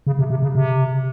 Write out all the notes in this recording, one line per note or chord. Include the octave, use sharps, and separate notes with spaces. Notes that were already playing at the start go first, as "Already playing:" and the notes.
C#3
C3
C3
C#3
C3